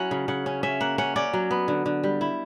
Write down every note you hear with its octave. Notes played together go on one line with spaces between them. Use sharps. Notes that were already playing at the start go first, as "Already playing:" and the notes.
Already playing: F#3 C#4 E4 F#5
C#3
C#3 F#5
C#4
C#4 E5
A#3 F#5
C#4 F#5
C#4 D5
F#3
B3
D3
D3
G3
E4